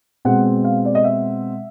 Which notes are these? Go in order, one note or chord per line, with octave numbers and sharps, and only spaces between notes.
B2 G#3 C4 F#5
F5
D5
D#5
E5